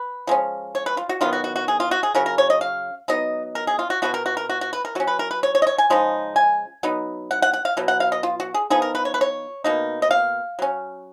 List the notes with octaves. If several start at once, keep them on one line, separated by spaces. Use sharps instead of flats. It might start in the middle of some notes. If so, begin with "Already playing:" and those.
Already playing: B4
F3 G#3 C#4
C#5
B4
F4
F#4
D#3 F#3 B3 F4
F#4
F#4
F#4
G#4
F4
F#4
G#4
C#3 F#3 C#4 A#4
A#4
C#5
D#5
F5
F#3 B3 D#4 D#5
A#4
G#4
F4
F#4
B2 G#3 B3 F#4
A#4
F#4
A#4
F#4
F#4
B4
A#4
F#3 C#4 F#4
B4
A#4
B4
C#5
C#5
D#5
C#5
G#5
C#3 F3 G#3 D#4
G#5
F#3 B3 D#4
F#5
F#5
F#5
F5
B2 F#3
F#5
F5
D#5
F4
F#4
G#4
F3 B3 D#4 G#4
A#4
B4
C#5
B4
C#5
B2 A#3 D#4
D#5
F5
F#3 C#4